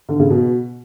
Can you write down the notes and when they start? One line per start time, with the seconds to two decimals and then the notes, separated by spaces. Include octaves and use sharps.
0.09 D3
0.20 C#3
0.30 B2